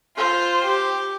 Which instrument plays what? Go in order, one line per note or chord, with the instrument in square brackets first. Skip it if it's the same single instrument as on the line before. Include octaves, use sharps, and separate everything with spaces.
[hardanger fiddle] F4 [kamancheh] C5
[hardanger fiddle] G4